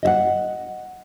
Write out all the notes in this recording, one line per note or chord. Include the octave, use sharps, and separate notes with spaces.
D#5 E5 F#5